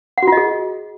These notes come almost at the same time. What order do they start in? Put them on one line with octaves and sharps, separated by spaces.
F#5 F#4 F4 D#5 G#4